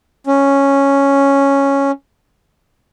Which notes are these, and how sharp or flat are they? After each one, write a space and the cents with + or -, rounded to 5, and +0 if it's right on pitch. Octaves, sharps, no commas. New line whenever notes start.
C#4 -5